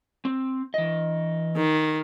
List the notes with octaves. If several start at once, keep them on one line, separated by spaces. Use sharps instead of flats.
C4
E3 D#5
D#3